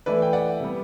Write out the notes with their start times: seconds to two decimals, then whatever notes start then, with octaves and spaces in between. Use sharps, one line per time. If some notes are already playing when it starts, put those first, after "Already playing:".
0.06 E3 A3 E4 B4 D5
0.22 G5
0.33 D5 F#5
0.60 C3 G3 B3